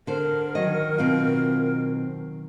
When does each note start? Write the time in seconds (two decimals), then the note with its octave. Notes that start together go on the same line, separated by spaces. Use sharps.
0.07 D3 A#4 C5
0.55 D#3 F#3 D#5
0.98 B2 C4 F4